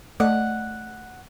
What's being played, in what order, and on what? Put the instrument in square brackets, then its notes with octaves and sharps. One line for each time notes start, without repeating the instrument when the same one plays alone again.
[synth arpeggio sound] A3 D5 D#5 [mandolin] F#5